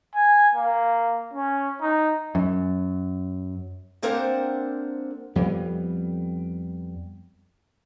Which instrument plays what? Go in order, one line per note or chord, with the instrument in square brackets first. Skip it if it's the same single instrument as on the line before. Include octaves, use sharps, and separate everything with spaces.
[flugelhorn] G#5
A#3
C#4
D#4
[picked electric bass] F#2
[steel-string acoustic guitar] A#3 C4 D4 A#4 C5 F#5
[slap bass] F2 G3 B3